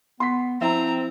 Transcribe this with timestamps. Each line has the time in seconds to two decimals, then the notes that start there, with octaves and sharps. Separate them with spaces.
0.20 B3 C6 B6
0.61 F3 C4 E4 A#5